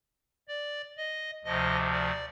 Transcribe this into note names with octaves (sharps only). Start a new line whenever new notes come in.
D5
D#5
D2 C3 F3 D#5
D5